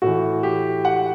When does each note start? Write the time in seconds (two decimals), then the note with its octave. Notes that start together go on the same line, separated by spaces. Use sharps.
0.02 A2 E3 F#4
0.43 G4
0.85 F#5